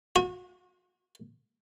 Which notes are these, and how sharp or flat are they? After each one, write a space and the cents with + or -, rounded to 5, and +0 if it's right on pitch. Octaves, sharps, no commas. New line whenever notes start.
F#4 -35